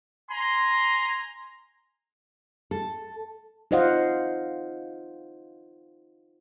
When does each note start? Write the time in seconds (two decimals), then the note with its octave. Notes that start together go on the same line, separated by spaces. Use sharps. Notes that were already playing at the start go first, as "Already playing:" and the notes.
0.30 G#5 A#5 C6
2.71 A4
3.71 D#4 F4 C5 D#5 F5 F#5